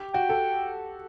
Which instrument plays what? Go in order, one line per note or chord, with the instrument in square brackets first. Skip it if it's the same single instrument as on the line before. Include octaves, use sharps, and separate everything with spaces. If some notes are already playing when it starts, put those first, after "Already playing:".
Already playing: [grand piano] G4
[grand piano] F#4 [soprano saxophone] G5
[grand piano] A4